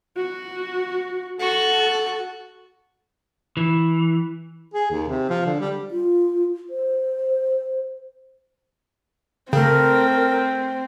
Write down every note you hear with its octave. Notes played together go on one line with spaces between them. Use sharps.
F#4
F#4 A4
E3
G#4
D#2
C3
F3
D3
G3
F4
C5
C#3 A3 C4 A#4 G5